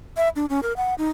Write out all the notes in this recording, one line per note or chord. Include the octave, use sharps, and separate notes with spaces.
E5
D4
C#4
A#4
F#5
D#4